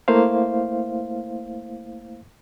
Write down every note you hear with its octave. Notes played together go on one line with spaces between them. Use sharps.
A3 A#3 E4 C5 F5